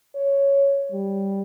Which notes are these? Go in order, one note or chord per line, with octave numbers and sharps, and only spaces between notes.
C#5
G3